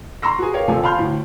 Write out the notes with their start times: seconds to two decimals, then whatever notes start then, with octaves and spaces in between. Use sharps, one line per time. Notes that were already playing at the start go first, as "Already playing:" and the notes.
0.22 A#5 C6 C#6 E6 A#6
0.38 F#4 G#4
0.53 G4 A#4 C#5 F5
0.68 D#1 A#1 C3 A4 G#5
0.83 F5 A5 B5 C6 F6 G6
0.98 D2 A2